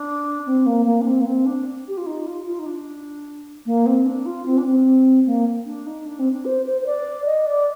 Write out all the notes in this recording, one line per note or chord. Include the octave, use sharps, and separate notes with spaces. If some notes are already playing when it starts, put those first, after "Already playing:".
Already playing: D4
C4
A#3
A#3
D4
C4
A#3
C4
D4
G4
F4
D#4
F4
F4
D#4
D4
A#3
C4
D4
F4
C4
D4
C4
A#3
D4
D#4
D4
C4
D4
C5
C5
C5
D5
D#5
D5